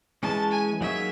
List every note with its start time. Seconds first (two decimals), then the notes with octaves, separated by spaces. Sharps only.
0.23 E3 G#3 C#4 A5
0.51 G#5
0.81 F#3 A#3 D#4 G#4 C#5 E5